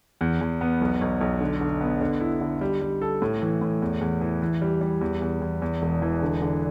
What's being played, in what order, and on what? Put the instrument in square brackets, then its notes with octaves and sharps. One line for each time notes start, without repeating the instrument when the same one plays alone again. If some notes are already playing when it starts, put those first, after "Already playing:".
[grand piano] E2
E2
B3
B1
B1
B1
D3
D3
B3
D3
E4
D3
G3
G3
A4
A2
E3
A2
E2
E2
E3
E3
G3
G3
E2
E2
E2
E2
E1
E3
D3
D3